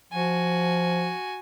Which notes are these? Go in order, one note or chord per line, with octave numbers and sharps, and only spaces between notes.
F3 F#4 G#5